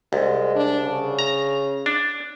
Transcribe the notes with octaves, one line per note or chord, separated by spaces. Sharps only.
C2 G#3
D4
C#3
A#5
D4